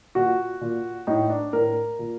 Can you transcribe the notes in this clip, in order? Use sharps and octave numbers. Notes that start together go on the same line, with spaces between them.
A#2 F#4
A#2
A2 D#4
D4
A2 A#4
A#2